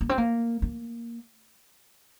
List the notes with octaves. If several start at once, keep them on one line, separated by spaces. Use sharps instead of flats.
A#3
C4
A#3
A#3